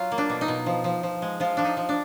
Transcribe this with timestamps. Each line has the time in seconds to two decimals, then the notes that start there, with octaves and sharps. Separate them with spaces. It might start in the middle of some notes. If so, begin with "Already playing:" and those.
Already playing: F#3 F4
0.12 A#3
0.18 D4
0.30 B2
0.41 D#4
0.48 B2
0.66 F3
0.84 F3
1.03 F3
1.22 G#3
1.40 F3 F4
1.57 F3 D4
1.64 D#4
1.77 F3
1.89 D4